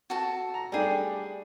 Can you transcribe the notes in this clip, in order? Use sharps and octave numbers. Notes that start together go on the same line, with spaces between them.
F#4 A4 A5
A#5
G3 A3 D4 G4 G#4